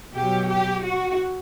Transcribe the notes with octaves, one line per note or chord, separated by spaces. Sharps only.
B2 F#3 G4
G4
F#4